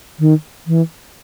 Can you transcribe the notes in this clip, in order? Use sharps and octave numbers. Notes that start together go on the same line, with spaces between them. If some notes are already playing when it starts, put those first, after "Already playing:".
D#3
E3